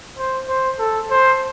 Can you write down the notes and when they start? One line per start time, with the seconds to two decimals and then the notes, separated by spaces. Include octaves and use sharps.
0.17 C5
0.48 C5
0.79 A4
1.10 C5